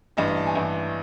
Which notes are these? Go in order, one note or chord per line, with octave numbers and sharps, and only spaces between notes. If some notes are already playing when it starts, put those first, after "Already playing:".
A1 G2 E3 D#5
D#5
A5
G#5
A1 G2 E3